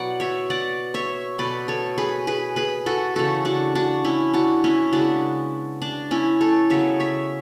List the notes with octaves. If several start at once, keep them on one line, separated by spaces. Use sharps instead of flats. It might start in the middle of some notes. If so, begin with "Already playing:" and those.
Already playing: B2 F#3 B3 D5 F#5
C#5 E5
D5 F#5
C#5 E5
B2 F#3 A3 B4 D5
A4 C#5
G#4 B4
G#4 B4
G#4 B4
F#4 A4
C#3 E3 A3 F#4 A4
D4 F#4
D4 F#4
C#4 E4
D4 F#4
C#4 E4
C#3 G#3 B3 D4 F#4
D4
C#4 E4
A4 C#5
C#3 F#3 B3 C#5 E5
C#5 E5